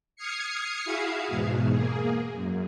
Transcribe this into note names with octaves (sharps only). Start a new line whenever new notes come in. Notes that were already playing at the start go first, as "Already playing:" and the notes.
D#6 F6 G#6 C7 C#7
E4 F#4 G#4 E5 F5
E2 G#2 B2
A#3 G#4
F#2